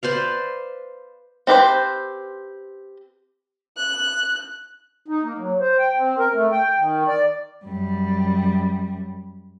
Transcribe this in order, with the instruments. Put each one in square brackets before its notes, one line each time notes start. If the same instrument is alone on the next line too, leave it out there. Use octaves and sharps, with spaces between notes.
[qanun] B4 C5 D5 F5
[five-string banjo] C4 G4 B4 C5
[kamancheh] F#6
[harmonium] D#4
A#3
F#3
C5
G5
C4
A#4
A3
G5
D#3
D5
[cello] F#2 G3